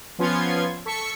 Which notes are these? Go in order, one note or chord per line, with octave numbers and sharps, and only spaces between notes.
F3 B3 C#4 F4 C6 G#6
A4 C#6 B6 C#7